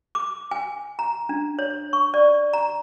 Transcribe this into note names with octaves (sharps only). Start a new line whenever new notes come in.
D6
G#5
A#5
D4
C#5
C#6
D5
A#5